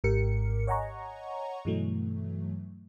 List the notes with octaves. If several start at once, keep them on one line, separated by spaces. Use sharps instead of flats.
G#1 G#2 G4 A#4 C#7
C#5 D#5 F#5 G#5 A#5 C#6
G2 B2 E3 F#3 A3